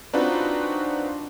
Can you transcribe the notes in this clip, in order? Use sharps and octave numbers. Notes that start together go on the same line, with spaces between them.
C4 D4 D#4 F4 F#4 B4